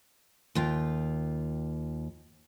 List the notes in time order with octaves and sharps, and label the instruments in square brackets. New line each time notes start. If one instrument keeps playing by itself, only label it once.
[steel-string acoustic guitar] D#2 F4 G5